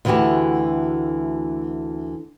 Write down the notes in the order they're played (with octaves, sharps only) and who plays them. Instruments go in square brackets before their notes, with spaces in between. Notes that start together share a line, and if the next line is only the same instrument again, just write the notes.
[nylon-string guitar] D2 D3 E3 A3 F#4 G4